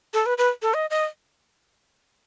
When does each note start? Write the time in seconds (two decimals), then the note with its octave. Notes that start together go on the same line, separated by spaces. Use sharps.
0.14 A4
0.26 B4
0.38 B4
0.62 A4
0.74 D#5
0.90 D#5